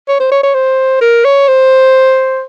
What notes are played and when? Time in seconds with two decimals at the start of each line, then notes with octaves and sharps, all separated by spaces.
0.09 C#5
0.20 C5
0.32 C#5
0.44 C#5
0.55 C5
1.01 A#4
1.25 C#5
1.48 C5